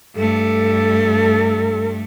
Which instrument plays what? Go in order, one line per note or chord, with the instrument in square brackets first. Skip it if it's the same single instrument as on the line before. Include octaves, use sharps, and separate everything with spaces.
[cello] G2 A3 [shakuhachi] A4